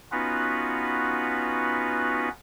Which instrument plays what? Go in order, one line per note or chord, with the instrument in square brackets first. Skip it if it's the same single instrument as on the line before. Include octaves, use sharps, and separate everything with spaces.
[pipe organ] B3 C#4 D#4 F4 F#4 B4